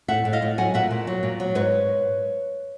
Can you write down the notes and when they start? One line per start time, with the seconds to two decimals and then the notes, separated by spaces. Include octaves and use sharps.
0.08 A2 E5 F#5
0.25 A2
0.33 D#5 F5
0.42 A2
0.58 F#3 F#5 G#5
0.74 A#2 E5 F#5
0.91 A#2
1.07 F#3
1.23 A#2
1.40 F#3
1.55 G#2 B4 C#5